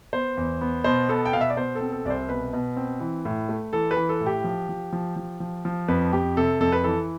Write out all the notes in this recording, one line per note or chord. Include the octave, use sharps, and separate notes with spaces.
B3 C5
E2
B3
B2 C5
B3 A4
G5
B2 F5
E5
D5
B2 C5
A4
C4
A4
C2 C5 D5
B2 B4
B2
C4
E3
A2
A3
E3 A4
B4
E3
A4
A2
G4
F3
F3
F3
F3
F3
F3
F2 B4
F2 G4
C3 A4
F2 A4
B4
E3 A4